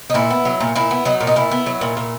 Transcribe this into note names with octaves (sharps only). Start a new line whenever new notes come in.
D#4
A#2 E4
B3
F#3
A#2
A#2 E4
B3
F#3 D#4
A#2
D#4
A#2 E4
B3
F#3
A#2
A#2